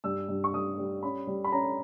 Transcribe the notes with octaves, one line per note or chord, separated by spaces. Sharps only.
G2 E6
G2
C#6
G2 D#6
G3
C#4 B5
G3
B5
C#4 A#5